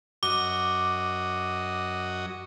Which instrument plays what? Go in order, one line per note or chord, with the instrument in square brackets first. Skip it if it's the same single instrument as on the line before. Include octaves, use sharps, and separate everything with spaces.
[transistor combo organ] F#2 F#4 D#5 [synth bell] D6